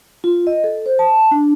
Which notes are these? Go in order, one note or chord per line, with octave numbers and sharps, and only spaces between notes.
F4
D#5
A4
C5
A5
D4